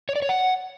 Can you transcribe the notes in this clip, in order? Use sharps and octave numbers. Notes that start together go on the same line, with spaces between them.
C#5
D5
C#5
F#5